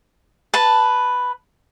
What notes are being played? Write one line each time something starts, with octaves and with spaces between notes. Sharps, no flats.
B4 A5